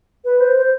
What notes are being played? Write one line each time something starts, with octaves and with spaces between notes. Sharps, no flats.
B4
C5
C5